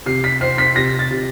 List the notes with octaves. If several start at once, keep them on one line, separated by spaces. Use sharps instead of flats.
C3 C7
B6
C4 C7
B6
C3 A#6
A6
C3